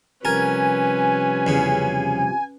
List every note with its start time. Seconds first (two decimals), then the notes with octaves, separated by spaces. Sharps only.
0.25 C3 F3 G3 C#4 A#4 B4 G#5
1.47 E2 C#3